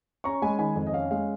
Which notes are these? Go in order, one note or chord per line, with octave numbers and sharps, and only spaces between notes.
C#4 A#5 C#6
G#3 G#5 B5
D#3 G#5 B5
F2
D#5
C#4 F5
G#3 F5